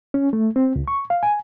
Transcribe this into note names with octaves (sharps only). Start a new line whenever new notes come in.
C#4
A3
C4
C#2
C#6
F5
G#5